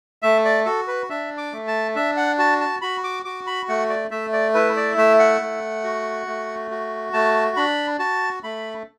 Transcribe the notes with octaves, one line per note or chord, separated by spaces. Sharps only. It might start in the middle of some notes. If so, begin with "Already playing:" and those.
A3 E5
D5
F#4 A4
B4
D4 E5
D6
A3
A5
D4 E5
F#5
F#4 A5
A5
F#4 B5
D6
F#4 D6
B5
A3 F#5
D5
A3 E5
D5
E4 B4
D5
A3 E5
F#5
A3
F#4
A3
F#4
A3 A5
D4 B5
F#4 A5
A3 B5